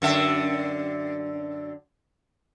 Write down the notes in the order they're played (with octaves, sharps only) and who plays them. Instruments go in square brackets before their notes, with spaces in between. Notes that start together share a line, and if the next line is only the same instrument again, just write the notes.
[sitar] F#2 D3 E5